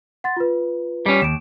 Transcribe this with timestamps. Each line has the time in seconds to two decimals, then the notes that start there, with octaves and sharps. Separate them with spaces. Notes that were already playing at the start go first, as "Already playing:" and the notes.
0.24 F#5 C6 A6
0.37 F4 B4
1.06 G3 C#4
1.22 D#2 D7 E7